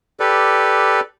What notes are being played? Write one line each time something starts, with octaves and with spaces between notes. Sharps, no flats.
G4 A4 B4 D5